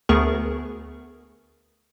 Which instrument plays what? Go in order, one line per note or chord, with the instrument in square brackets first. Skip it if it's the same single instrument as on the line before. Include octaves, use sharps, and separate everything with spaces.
[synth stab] D2 A3 B3 G#4 A#4 C#6